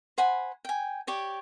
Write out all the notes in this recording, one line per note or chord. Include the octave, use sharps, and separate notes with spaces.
C5 F#5 G#5 B5
G5 G#5
G4 C#5 D5